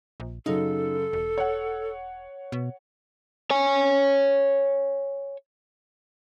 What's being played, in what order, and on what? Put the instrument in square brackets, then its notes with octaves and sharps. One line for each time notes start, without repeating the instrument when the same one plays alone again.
[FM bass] A#1
[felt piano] F#2 C#3 [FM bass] D#4 [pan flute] A4
[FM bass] E1
[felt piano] C#5 F#5
[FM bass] B2
[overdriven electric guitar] C#5 G#5